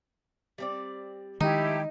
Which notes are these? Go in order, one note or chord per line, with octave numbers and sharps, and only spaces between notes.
G3 C4 D5
D#3 F3 G#3 A3 D#4 E4 G4